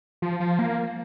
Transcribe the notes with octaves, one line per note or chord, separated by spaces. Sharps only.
F3
F3
A#3